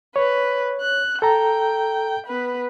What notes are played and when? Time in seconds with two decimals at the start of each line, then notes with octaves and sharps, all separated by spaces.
0.16 B4 C#5
0.80 F#6
1.22 A4 G5 A#5
2.27 B3 B4